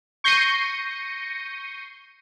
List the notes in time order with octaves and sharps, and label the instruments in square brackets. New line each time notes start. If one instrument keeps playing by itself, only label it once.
[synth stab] C#6 G6 A#6 C7 C#7 D#7